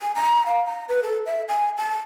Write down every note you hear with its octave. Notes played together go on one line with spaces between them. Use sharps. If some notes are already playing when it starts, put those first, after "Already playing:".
G#5
A#5
F5
A#5
B4
A4
E5
G#5
A5